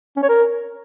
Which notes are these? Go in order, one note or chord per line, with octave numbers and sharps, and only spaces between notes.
C#4
C#5
A#4